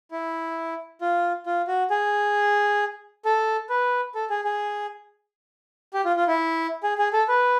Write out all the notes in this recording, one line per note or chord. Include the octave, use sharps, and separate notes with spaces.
E4
F4
F4
F#4
G#4
A4
B4
A4
G#4
G#4
G4
F4
F4
E4
G#4
G#4
A4
B4